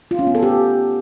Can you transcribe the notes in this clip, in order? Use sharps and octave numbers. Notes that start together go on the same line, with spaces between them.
F4
C#4
B3
A4
G4